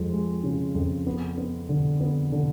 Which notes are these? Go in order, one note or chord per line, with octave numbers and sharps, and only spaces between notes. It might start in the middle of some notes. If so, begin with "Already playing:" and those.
Already playing: F2 F3 G#3
G#3
C#3
F2
B3
B3
D3
B3
D3